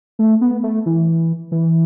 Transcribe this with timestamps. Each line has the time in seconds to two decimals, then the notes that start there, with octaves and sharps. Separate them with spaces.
0.19 A3
0.41 B3
0.63 A3
0.86 E3
1.52 E3